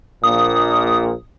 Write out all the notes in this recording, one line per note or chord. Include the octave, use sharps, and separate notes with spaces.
A#1 A#2 D#6